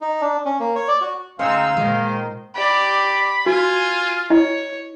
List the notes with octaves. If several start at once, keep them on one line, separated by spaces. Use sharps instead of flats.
D#4
D4
C#4
A#3
C#5
D5
F#4
D2 G#3 C4 C#4 D#4 C#5 F5 E6
A#2 D#3 G#3 C5
G4 D5 B5
F4 F#4 G#5
E4 C#5 D#5